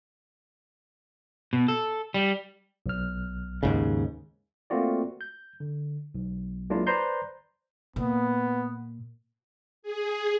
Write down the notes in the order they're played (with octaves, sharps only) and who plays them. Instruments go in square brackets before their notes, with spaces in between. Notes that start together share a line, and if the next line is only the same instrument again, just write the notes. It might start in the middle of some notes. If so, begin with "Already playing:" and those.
[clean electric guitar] B2
A4
G3
[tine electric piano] B1 F6
[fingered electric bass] D#2 G#2 C#3
[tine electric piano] A3 A#3 C4 F4 F#4 D5
G6
D3
B1
F#3 G#3 A#3 D4 E4 F4
B4 C5 D5 A#5 C6 G6
[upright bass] A#2 [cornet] B3
[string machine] G#4